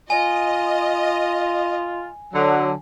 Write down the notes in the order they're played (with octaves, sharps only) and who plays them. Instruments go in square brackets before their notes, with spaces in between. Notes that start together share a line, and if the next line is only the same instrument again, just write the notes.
[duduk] F4 [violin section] D#5 [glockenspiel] G#5
[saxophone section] D3 F#3